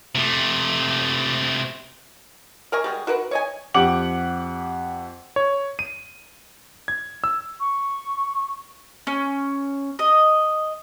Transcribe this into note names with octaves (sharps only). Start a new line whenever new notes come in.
C3 A3
A#4 D#5 G#5 C#6
G3 G#3 F#4 G#4
F#4 A#4 B4 F#5
C#5 D#5 G#5
F2 G4 F#5 D6 F#7
C#5
D#7
G#6
E6
C#6
C#4
D#5